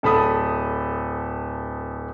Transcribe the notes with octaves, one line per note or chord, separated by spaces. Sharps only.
D1 A4 B5 D#6